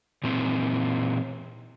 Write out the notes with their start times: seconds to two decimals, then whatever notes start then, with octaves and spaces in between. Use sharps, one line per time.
0.24 A#2 E3 C4